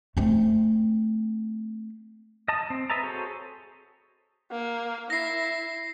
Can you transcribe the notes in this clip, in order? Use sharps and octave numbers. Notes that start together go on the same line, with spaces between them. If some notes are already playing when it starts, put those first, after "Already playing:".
A3 C4
D#5 A5 D#6
C4
B4 D#5 E5 A5 A#5
F#4 G#4 A4 C5 C#5
A#3
E4 A#6 C7